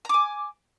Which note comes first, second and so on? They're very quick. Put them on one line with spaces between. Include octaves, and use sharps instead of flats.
A#5 D6 G#5